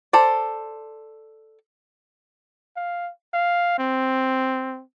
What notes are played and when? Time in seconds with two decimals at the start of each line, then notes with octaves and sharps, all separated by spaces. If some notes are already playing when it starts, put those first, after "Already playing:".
0.13 A4 C5 D5
2.76 F5
3.34 F5
3.79 C4